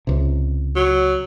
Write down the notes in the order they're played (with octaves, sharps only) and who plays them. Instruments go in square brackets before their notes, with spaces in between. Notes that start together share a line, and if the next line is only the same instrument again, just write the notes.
[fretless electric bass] C#2 C3
[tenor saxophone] F#3